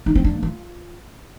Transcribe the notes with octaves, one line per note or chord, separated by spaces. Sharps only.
D#4
C4
D4
A#3
F4